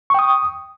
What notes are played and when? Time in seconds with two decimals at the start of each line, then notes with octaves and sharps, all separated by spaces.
0.10 C#6
0.14 G5
0.19 D#6